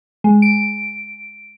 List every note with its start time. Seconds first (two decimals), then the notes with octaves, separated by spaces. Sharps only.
0.24 G#3
0.42 D7